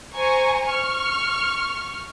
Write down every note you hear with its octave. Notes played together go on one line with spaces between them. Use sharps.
C5 G#5 A#5 C#6
C#6 F6